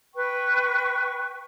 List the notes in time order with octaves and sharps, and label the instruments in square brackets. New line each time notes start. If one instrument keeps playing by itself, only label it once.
[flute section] B4 G5 C#6